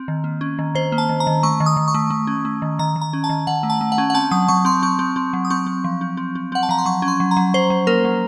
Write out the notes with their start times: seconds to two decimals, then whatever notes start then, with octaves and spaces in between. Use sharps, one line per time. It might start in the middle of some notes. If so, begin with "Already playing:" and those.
Already playing: C4
0.08 D#3
0.24 A#3
0.41 C#4
0.59 D#3
0.75 D#3 C5
0.92 A#3
0.98 A5
1.09 D#3
1.20 A#5
1.27 D#3
1.43 A3 C#6
1.60 D#3
1.66 D#6
1.77 D#3
1.88 C#6
1.94 A3
2.10 A3
2.27 C#4
2.45 A3
2.62 D#3
2.79 D#3 A#5
2.96 D#3
3.01 A#5
3.13 C#4
3.24 A5
3.29 D#3
3.47 D#3 F#5
3.63 A3
3.70 A5
3.81 A3
3.92 F#5
3.98 C#4
4.10 F#5
4.14 C4 A5
4.31 F#3 D#6
4.48 F#3 C#6
4.65 C4 C6
4.83 C4 C#6
4.99 C4
5.16 C4
5.33 F#3
5.45 D#6
5.50 C4 C#6
5.66 C4
5.84 F3
6.01 C4
6.17 C4
6.35 C4
6.52 C4 F#5
6.63 A5
6.69 F3 A#5
6.78 C6
6.86 F#3 C#6
7.02 C#4
7.08 C6
7.20 F#3
7.31 A#5
7.37 F#3
7.54 F#3 C5
7.70 F#3
7.87 A#3 A#4
8.05 F#3